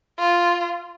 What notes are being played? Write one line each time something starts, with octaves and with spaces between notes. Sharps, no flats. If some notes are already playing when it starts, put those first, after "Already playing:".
F4